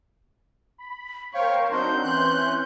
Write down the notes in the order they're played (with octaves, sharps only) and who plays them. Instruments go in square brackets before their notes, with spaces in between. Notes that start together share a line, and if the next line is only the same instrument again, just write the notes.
[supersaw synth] B5
[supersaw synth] A#4 C5 [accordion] C#5 G5 [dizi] F5 [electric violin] C#6
[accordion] F#3 D4 D#4 [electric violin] C4 G6 [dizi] C6
[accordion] E3 F#6 [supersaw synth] C#4 [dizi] C6